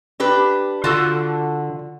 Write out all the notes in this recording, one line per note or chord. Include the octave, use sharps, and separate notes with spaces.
D4 G4 B4
D3 F4 F#4 A4